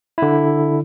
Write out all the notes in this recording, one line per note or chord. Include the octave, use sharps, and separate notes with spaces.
D3 E4